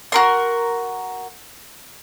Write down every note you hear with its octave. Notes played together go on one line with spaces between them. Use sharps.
F#4 A#4 C6